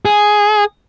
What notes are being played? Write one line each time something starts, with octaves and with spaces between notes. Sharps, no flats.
G#4